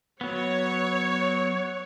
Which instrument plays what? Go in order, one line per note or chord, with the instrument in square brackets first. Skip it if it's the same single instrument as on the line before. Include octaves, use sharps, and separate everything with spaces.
[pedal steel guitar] F#3 B3 [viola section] C#5